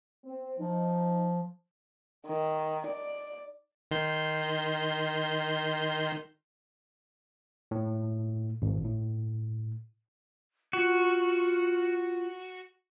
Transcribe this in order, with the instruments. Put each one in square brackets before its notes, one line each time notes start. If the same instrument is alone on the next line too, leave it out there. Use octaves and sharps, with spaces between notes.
[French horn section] C4
[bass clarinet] F3 [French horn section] D#4
[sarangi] D#3
D5
[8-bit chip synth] D#3 C6 G6
[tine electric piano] A2
G#1
A2
[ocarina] F4 [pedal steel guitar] F#4